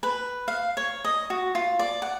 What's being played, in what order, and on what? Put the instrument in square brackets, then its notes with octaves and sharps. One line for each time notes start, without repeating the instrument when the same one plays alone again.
[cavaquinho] B4
F5
C#5
D#5
F#4
F4
D5
F#5